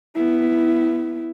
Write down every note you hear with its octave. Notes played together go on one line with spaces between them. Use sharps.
B3 E4